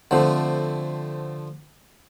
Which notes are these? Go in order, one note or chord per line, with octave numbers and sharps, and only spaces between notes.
D3 F3 A3 C4 F#5